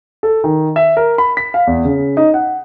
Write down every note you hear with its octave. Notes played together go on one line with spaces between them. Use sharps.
A4
D#3
E5
A#4
B5
B6
F5
E2
C#3
D#4
F#5